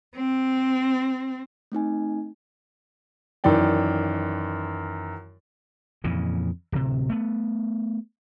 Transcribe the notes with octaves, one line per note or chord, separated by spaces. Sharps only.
C4
A3 C4 D#4 G#5
F#2 D#3 E3 D5 G5
F2 A#2 C#3 E3
D1 C3
A3 B3